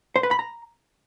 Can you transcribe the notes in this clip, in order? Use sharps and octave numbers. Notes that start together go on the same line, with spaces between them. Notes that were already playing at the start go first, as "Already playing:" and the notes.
C5
B4
B5
A#5